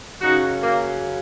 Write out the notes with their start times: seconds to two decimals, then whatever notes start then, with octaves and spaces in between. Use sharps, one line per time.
0.20 F#2 C#3 F#3 D#4 F#4
0.61 F#3 A#3